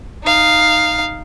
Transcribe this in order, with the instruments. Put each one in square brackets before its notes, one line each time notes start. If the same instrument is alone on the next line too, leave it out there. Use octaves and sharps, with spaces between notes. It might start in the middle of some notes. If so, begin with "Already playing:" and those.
[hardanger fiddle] D#4 F5